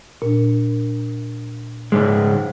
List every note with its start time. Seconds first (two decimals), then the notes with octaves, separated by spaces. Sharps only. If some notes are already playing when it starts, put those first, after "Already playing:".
0.22 A#2 D4
1.92 C#2 G#2 G#3